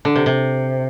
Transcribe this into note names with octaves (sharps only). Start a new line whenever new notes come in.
D3
C3
C3